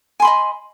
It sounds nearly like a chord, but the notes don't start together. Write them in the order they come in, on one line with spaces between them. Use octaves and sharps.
G#5 C6 B5 D#5